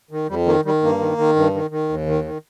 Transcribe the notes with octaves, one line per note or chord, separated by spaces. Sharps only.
D#3
F2 G3
D#3 A#3
D#3 G3
G2 A#3
D#3
D#3
G2
D#3
D#3
D#2
D#3
D#3